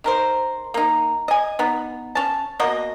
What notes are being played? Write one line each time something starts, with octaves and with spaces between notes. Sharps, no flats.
D#3 A#4 C5
A#3 D#4
D#5 G#5
B3 D#4
C#4 A5
B2 A#3 F#4 D#5